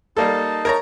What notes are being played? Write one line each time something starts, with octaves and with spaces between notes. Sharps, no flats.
G3 A#3 D#4 A4 A5
A#4 C#5 A#5